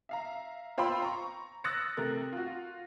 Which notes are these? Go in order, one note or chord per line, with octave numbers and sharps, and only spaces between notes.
E5 F5 A#5
F4 C5 G5 B5 C6 E6
A#5 C#6
D#6 E6 F#6 A6 A#6 C#7
C3 A3 A#4 F#6
F4 F#4